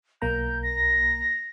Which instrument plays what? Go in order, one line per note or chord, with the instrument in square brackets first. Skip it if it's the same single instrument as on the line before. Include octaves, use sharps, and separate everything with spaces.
[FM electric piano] B1 A#3 A#5 [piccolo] G6
[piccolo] A#6